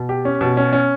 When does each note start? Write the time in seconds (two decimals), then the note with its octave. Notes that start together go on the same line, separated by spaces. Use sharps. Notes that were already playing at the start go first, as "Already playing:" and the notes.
Already playing: B2
0.09 G4
0.25 C#4
0.41 B2
0.57 C#4
0.73 C#4